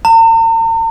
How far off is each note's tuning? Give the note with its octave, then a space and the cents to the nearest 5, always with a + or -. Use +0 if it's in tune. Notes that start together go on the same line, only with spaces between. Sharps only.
A#5 -45